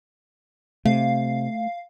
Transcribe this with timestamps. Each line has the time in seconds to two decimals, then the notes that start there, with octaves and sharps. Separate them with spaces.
0.85 C3 A3 F5